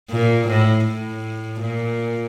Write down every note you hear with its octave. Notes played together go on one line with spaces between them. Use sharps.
A#2
A2
A2
A#2